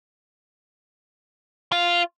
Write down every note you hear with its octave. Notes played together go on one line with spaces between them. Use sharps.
F4